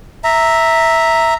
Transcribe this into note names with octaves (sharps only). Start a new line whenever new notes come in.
E5 A#5